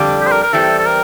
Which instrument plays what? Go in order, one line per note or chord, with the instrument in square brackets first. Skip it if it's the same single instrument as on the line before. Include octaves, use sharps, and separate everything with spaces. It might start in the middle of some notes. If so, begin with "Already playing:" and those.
Already playing: [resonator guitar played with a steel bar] F2 D3 G3 D4
[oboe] G4
C5
A#4
A#4
[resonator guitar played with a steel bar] E3 G3 C4 [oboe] A4
[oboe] A4
A#4